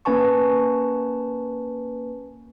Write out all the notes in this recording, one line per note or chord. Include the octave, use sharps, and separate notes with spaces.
A#3 C#4 B4 G#5 A5 C#6